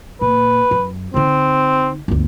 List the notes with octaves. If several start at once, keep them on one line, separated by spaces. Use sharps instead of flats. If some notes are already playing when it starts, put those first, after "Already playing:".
A#2 B4
F#2
D3 C4 D#4
G1 D2